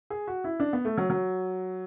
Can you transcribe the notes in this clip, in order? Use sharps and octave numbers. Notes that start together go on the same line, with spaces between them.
G#4
F#4
E4
D4
B3
A3
F#3
F#3